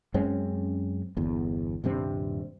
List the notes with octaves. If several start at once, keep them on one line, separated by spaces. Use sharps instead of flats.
F#2 G#3 C4 C#4
G1 E2
D#1 G2 C3 C4